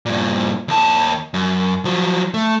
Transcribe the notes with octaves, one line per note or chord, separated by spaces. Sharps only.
G2 A#2
D#2 A5
F#2
F3 F#3
A3